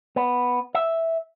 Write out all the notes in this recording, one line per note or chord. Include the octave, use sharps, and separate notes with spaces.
B3
E5